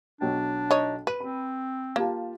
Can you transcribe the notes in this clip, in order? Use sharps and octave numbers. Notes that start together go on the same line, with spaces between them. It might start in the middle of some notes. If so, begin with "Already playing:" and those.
B1 F#3 D4 G5
D#4 C#5
B4 D#7
C4 B5
A#3 F4 G4 A5